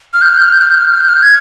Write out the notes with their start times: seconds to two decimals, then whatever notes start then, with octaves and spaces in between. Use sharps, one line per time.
0.14 F6
0.22 G6
0.29 F6
0.38 G6
0.45 F6
0.53 G6
0.61 F6
0.69 G6
0.77 F6
0.85 G6
0.92 F6
1.01 G6
1.09 F6
1.22 G#6